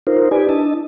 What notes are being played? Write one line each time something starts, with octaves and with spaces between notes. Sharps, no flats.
D#4 F4 A#4 C5
D#4 G4 B4 D5 G#5
D4 E4 D#5 A5